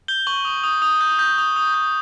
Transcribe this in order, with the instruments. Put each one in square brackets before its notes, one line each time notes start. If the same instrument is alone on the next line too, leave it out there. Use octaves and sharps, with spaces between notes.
[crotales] G6 G7
C#6 F#7
D#6
D#6
D#6
G6
G6
D#6
D#6
G6